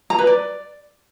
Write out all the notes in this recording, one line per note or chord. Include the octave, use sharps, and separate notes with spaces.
A#5
B4
D5